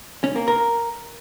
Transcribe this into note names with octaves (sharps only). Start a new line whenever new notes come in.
C#4
A#3
A#4